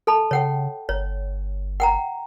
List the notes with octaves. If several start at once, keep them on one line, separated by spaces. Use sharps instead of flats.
A4 A5 B5
C#3 C#5 F#5 G5
G1 C#5
F#5 G5 A#5